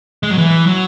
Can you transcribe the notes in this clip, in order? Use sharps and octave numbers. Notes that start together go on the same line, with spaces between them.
G#3
F#3
E3
F#3